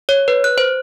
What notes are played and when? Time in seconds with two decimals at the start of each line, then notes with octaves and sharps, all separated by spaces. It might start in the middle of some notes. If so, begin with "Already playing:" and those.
0.09 C#5
0.28 B4
0.44 F#6
0.58 C5